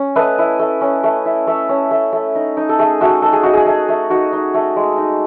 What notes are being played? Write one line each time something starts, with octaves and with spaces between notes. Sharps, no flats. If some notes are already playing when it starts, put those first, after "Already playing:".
Already playing: C#4
A3 B4 D#5
E4
A3
C#4
A3
E4
A3 C#5 E5
C#4
A3
A3
D#4
D#4
A4
A3 G#4
A3 F#4
D#4 A4
G#4
D#4 F#4
G#4
A3
A3
D#4 F#4
D#4
A3
G#3
D#4